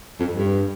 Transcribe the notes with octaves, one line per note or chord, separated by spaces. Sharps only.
F2
G2